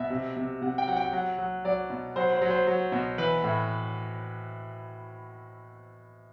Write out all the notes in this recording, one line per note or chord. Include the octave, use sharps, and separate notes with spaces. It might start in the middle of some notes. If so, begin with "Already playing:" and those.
Already playing: B2 E5
C3
C3
C3 F#5
G5
F#3 F#5
G5
F#3 F#5
F#3
F#3 D5
B2
F#3 C5
C5
F#3
C5
F#3
B2
E3 B4
A2